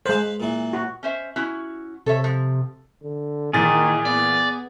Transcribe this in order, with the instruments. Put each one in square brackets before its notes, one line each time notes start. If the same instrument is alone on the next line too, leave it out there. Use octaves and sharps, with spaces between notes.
[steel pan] G#3 C5 [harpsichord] B4 F5
[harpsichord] A#2 E3
[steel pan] F#4
[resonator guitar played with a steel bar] C#4 C5 E5
C#4 E4 F#4
[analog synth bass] C3 [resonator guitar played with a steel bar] A4 C#5 E5
[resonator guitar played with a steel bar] F3
[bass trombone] D3
[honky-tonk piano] A#2 E3 A6 [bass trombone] D#3 [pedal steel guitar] G#4
[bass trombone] B3 [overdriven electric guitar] D5